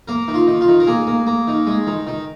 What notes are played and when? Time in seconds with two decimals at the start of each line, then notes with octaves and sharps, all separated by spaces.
0.08 A#3 A#4
0.28 D#3
0.34 F4
0.47 D#3
0.61 F4
0.68 D#3
0.80 A#4
0.87 A#3 G#4
1.07 A#3
1.27 A#3
1.48 D#3
1.67 G#3
1.87 D#3
2.07 D#3